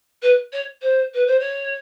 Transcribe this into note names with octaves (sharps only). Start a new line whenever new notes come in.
B4
C#5
C5
B4
C5
C#5